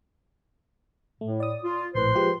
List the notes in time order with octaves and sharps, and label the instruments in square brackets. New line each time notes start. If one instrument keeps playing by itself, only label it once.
[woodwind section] A2 [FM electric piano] A3
[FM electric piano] D5 D#6
[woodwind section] F4
[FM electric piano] A#1 A2 [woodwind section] B4 C5 C6
[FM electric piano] F3 G#3 G4